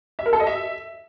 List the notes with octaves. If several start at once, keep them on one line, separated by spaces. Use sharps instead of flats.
E5
A#4
A4
D#5
E5